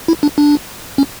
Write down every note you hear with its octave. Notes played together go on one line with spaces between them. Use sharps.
E4
D4
D4
C#4